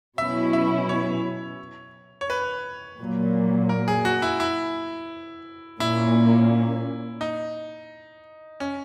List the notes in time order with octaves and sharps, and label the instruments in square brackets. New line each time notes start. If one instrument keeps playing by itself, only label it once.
[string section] B2 F#3 C#4 E4 [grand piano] E5
[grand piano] E5
C#5
C#5
B4
[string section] A#2 F#3 A#3
[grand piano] A#4
G#4
F#4
E4
E4
[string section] A#2 A#3 C#4 [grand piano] E4
[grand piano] D#4
C#4